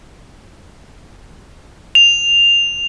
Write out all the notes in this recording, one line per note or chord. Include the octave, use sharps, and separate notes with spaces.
F7